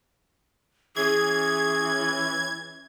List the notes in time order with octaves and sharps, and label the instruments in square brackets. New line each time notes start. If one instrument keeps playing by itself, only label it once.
[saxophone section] E3 C#4 [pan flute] G#4 [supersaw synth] G#6